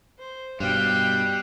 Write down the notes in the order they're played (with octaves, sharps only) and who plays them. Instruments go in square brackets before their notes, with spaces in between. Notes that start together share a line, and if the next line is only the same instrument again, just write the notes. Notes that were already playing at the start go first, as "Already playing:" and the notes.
[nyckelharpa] C5
[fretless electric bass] G2 B2 [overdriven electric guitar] G3 [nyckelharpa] F5 G5 [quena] F#6